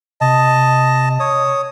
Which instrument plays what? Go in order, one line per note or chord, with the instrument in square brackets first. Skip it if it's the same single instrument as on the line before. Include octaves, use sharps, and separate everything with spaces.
[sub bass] C3 [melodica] D#5 A5
[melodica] C#5 D#6